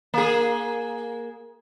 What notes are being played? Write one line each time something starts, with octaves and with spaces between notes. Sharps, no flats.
A#3 G#4